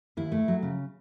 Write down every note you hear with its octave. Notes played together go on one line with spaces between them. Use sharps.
D#2 E4
A3
F#3
C#3